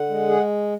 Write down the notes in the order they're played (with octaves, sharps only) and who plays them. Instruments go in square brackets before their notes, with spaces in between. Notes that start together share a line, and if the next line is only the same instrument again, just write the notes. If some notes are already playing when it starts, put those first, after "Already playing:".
Already playing: [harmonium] D3 F#5
G#3
G#4